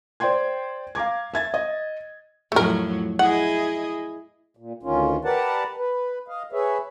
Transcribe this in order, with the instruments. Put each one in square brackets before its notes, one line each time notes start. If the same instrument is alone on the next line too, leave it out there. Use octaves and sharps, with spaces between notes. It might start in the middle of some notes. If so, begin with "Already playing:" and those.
[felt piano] C5 D5 G5 C6 G#6
F5 A#5 D6 G#6
E5 G#6 A6
D#5
[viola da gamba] F2 A2 F#3 [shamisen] A3 A#4
[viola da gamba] E4 G#4 D#5 [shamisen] F#5
[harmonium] A#2
D2 D#3 C#4 F4
G4 A#4 B4 D5 F#5 A5
B4
D#5 F5
G#4 B4 C#5 E5